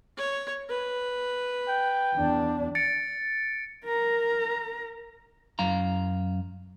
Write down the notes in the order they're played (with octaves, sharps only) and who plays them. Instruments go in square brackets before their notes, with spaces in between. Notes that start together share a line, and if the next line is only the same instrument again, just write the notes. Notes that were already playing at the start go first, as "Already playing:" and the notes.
[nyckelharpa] C#5
B4
[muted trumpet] G5
[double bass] E2 D4
[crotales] A6 C#7 D7
[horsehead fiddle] A#4 A#5
[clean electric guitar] F#2 F5 A#5